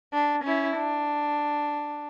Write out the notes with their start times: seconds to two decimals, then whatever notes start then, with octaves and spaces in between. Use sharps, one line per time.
0.14 D4
0.45 C#4 E4
0.77 D4